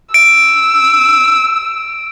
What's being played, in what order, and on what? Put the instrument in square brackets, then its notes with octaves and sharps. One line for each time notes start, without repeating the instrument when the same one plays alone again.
[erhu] E6 [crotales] D7